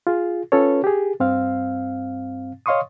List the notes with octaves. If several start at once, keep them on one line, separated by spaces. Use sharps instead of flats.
F4 G#4
C#4 F4 A4 B4 C#5
G4 G#4
G2 C4 F5
C#5 D#5 F5 C6 C#6 D#6